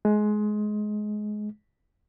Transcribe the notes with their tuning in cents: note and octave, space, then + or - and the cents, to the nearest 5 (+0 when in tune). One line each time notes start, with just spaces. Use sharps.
G#3 +20